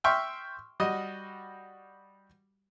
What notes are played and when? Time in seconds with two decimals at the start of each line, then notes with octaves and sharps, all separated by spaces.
0.04 E5 G5 C6 C#6 F6
0.80 G3 F#4 D#5